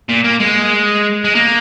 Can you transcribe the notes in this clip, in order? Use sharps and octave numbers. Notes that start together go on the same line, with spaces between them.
A#2
A#3
G#3
G#3
A#3